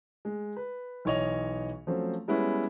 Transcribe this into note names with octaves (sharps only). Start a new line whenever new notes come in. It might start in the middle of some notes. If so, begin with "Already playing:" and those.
G#3
B4
B1 E3 C#5 D#5 F7
F3 F#3 A3 C4 C#4
G3 G#3 B3 C#4 E4